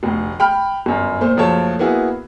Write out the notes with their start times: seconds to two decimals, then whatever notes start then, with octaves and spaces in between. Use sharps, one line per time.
0.03 F1 D2
0.40 G5 B5 F6
0.86 G1 F#2
1.21 A#2 A3 C5
1.37 F#1 F3 A3 C#5 A5
1.79 A#3 B3 E4 F#4 G#4